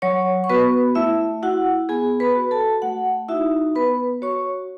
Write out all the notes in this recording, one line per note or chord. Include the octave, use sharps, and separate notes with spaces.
F#3 C#5 C#6
C#6
B3 F#4 B4 B5
A3 E4 E5
E4 F#4 F#5
B3 G#4 G#5
B4 B5
F#4
A4 A5
A3 F#4 F#5
D#4 E4 F#4 E5
B3 B4 B5
F#4 C#5 C#6